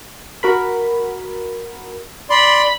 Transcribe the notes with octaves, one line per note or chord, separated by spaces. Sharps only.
F#4 A#4 B5
D5 B5 C6